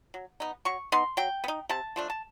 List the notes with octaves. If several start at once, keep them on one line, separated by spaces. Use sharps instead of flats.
F#3
B3 D#4
F#3 C#6
B3 D#4 C6
F#3 G5
B3
D#4
C3 A5
F3 A3 D4
A5